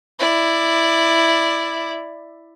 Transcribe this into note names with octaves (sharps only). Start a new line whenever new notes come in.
E4 D5